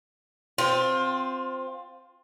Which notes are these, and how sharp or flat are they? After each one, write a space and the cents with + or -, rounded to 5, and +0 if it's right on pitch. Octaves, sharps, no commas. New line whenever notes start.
C4 +0 F4 +25